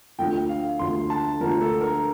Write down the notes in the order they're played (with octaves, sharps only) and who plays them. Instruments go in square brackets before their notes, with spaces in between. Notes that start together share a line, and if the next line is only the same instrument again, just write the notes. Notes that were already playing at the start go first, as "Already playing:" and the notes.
[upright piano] D2 D3 F3 [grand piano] G5
[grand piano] F5
[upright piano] D2 D3 F3 [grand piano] C6
[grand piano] A5
[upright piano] D2 D3 F3 [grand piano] A#4
[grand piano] A4
A#4